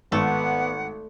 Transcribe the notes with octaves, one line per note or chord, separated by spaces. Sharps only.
G#1 A3 B3 F#5